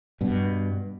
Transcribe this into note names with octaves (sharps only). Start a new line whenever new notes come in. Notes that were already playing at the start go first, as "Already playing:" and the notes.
G2 B2